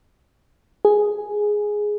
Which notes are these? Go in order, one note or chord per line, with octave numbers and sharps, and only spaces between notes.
G#4